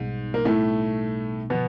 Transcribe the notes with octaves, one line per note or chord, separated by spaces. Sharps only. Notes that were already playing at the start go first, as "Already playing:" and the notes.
Already playing: B1 G#2 B2 G3 B3 D#4
A#3
A2 A3
B2 D3 F3 B3